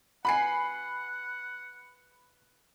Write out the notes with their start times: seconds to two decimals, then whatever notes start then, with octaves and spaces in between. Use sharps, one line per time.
0.25 F#4 B4 F#5 G#5 B5 C7